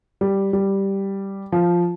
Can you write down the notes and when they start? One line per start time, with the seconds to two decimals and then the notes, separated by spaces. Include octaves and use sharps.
0.21 G3
0.53 G3
1.52 F3